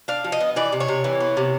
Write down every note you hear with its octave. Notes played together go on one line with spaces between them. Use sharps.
D4 F5
F3
D#5
B3
E3 D5
C3
C#5
C3
E3
B3
C3